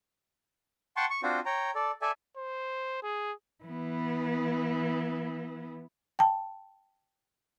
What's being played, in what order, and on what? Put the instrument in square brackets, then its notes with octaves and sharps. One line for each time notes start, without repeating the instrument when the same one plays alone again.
[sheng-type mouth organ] F#5 G5 A5 C6 C#6
C#6
C4 D4 F4 F#4 C5
C#5 G5 A#5
A4 D5
A4 D5 E5 G#5
[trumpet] C5
G#4
[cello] E3 B3
[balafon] G5 A5